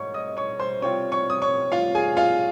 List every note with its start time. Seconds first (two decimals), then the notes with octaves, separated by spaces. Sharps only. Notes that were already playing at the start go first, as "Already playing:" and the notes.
Already playing: G#2 C#5 C#6
0.14 D#5 D#6
0.37 C#5 C#6
0.60 C5 C6
0.82 C3 G3 C4 F4 C#5 C#6
1.12 C#5 C#6
1.30 D#6
1.42 C#5 C#6
1.72 F4 F5
1.95 G#4 G#5
2.17 F4 F5